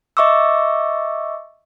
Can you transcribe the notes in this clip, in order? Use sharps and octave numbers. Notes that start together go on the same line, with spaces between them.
D#5 E5 C#6 D6 E6